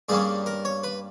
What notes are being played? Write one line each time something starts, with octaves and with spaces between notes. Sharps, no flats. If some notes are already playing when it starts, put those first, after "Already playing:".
G2 G3 A#3 C#4 G#4
A#4
C#5
B4